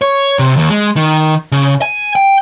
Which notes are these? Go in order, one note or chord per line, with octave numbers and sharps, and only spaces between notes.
C#5
C3
D#2
G#3
D#3
C#3
G#5
G5